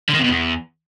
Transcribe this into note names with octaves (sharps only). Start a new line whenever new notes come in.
D3
D#3
C3
B2
E2